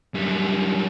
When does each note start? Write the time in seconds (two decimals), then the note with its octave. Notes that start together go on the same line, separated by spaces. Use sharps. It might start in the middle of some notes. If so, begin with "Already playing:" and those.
0.15 F#2 G3